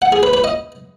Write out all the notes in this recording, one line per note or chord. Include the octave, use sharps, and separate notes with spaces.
F#5
G#4
B4
B4
D#5